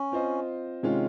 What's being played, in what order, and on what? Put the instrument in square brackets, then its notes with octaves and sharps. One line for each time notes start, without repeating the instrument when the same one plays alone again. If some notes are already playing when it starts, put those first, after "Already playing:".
Already playing: [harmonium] C#4
[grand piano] C4 F4 C5 D#5
C3 D#3 G#3 C#4 F4